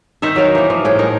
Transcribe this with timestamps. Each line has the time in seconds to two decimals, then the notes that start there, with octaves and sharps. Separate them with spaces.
0.22 D#3 D#4 C5 E5
0.36 F#3 A#4 F5
0.55 E3 A#3
0.70 F3
0.85 A2 G#4 G5
0.99 D#4 A#4